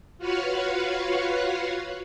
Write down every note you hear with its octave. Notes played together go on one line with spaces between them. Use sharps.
F4 F#4 B4 C#5 F5 F#5